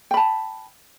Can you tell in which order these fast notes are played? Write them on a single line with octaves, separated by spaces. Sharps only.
G5 B5 A5